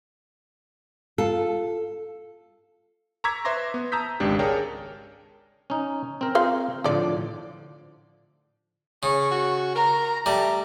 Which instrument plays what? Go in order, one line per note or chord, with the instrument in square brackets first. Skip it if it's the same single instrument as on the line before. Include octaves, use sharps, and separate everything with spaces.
[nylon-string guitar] F4 A4
[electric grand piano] A#5 C#6 D6 E6 G#6 B6
B4 C5 E5 C6 D6 A#6
B3
A5 A#5 D#6 E6 G6 B6
G#1 C#2 D4 G4
G#4 A#4 C#5 D5 G5 A5
[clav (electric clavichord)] C#4 D#4
C4 A#4
[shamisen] F4 C5 F5
[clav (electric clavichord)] A2 D3 F3 [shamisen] F4 D5
[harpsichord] C#3 [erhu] C#6
[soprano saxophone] F#4
[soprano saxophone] A#4 [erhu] A#5
[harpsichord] G3 [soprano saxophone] A3 [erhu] A#5